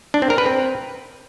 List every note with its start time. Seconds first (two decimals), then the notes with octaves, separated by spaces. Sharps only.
0.14 D4
0.22 C4
0.30 A#4
0.38 B4
0.46 C4